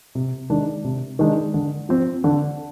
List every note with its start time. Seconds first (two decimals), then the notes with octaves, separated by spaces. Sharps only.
0.15 C3
0.50 D#3 G#3 D4
0.84 C3
1.19 D#3 G#3 D4
1.54 D3
1.89 F3 C4
2.24 D3